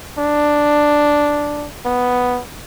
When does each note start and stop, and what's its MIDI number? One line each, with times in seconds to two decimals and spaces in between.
0.18 1.67 62
1.85 2.41 59